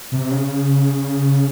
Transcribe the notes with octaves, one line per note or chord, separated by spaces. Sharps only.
C3
C#3